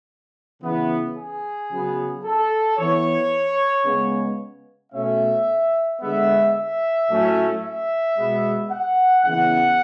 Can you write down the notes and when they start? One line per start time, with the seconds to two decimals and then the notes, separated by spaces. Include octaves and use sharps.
0.62 C#3 E3 B3
1.16 G#4
1.70 C#3 F#3 B3
2.24 A4
2.78 E3 B3 C#5
3.85 C#3 G#3 B3
4.93 B2 A3 C#4 E5
6.01 D3 G#3 B3 E5
6.54 E5
7.09 A2 F#3 A3 C#4
7.62 E5
8.17 B2 G#3 B3
8.70 F#5
9.23 C#3 E3 B3 F#5